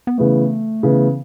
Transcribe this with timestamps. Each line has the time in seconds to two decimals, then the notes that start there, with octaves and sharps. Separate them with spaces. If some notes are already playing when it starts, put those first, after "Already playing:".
0.07 B3
0.18 C#3 E3 A3 B3
0.83 C#3 E3 B3